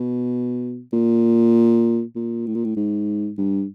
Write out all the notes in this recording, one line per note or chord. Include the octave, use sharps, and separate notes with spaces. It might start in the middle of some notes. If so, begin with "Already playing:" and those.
Already playing: B2
A#2
A#2
A2
A#2
A2
G#2
G2